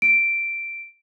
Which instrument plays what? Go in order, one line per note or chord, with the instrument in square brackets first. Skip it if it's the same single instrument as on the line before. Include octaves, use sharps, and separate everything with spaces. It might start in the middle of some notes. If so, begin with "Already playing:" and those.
[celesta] D7